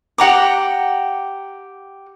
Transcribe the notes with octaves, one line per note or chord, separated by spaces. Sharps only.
G4 F#5 A#5 D6